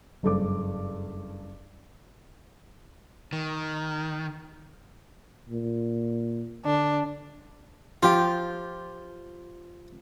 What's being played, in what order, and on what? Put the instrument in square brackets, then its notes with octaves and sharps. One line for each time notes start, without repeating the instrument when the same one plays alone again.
[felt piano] F#1 G2 A4 D6
[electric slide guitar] D#3
[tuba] A#2
[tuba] D3 [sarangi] D4
[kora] F3 G4 G5 [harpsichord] F4